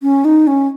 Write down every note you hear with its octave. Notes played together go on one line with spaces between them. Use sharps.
C#4
D#4
C#4